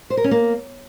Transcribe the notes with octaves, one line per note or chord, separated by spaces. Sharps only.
C5
A#4
C#4
A#3